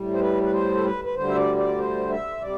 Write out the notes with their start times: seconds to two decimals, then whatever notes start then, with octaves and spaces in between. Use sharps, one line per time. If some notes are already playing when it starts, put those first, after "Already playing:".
Already playing: A2 G3
0.13 C5
0.20 B4
0.43 B4
0.52 C5
0.75 A4
0.84 B4
1.04 B4
1.15 D2 D3 G3 C5
1.29 E5
1.36 D5
1.57 D5
1.78 C5
2.10 E5
2.41 C3 G3 D5